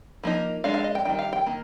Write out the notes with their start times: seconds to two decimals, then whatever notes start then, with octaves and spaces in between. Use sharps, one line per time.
0.23 F3 A#3 D#4
0.64 G#3 D4 F5
0.74 F5
0.84 D#5
0.95 G5
1.05 D#3 G3 D#4 G5
1.19 F5
1.33 G5
1.46 D#3 A#3